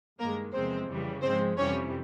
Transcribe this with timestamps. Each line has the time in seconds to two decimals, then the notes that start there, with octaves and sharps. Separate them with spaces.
0.19 G2 D#3 G#3 A#3 A#4
0.53 E2 C3 F3 G#3 C4 C5
0.88 F2 C#3 E3 G3
1.23 G#2 F3 G#3 C4 C5
1.57 F2 C3 E3 G3 C#4 C#5